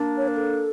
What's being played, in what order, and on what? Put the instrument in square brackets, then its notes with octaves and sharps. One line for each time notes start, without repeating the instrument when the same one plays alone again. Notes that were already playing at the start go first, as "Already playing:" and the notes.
Already playing: [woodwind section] A#3 D4
[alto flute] C#5
A#4
A4